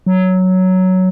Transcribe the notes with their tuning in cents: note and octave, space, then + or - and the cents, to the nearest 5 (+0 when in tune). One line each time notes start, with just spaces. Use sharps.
F#3 +5